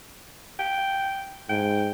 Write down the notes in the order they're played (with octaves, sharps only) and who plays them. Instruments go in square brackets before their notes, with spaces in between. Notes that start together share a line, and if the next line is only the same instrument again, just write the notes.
[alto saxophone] G5
[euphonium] G#2 [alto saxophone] G5